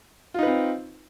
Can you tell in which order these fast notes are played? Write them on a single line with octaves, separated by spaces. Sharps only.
F4 D#4 B4 C4